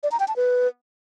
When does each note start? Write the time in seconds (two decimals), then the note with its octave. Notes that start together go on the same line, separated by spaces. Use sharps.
0.03 D5
0.12 A#5
0.20 G5
0.28 A5
0.36 B4